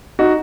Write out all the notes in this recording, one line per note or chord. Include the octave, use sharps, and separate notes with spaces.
D#4 F#4